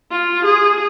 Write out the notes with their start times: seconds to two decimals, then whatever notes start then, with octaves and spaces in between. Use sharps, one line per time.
0.11 F4
0.45 G#4